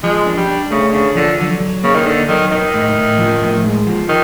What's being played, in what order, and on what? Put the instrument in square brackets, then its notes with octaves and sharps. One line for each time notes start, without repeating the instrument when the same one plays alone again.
[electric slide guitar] F3 [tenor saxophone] G#3
[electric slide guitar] D4
[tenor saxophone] G3
[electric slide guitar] D4
[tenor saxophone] C#3 [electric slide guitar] A3
[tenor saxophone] C#3 [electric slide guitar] D4
[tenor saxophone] D3 [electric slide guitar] F3
[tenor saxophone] D3 [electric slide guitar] F#3
[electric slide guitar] F#3
[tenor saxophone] C#3 [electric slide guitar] A#3
[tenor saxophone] D#3
[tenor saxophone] D3 [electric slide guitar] D#4
[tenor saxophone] D#3 [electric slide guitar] F#3
[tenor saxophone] D#3 [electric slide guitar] D#4
[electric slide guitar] A2
A2
F3
A2
G#3
F3
[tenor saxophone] D#3